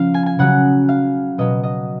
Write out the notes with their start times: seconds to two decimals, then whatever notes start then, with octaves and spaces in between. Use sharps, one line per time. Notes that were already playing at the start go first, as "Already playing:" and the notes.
Already playing: C#3 F3 F5
0.14 G#5
0.26 G#5
0.39 C#3 F#3 F#5
0.89 F5
1.38 B2 F#3 D#5
1.63 D#5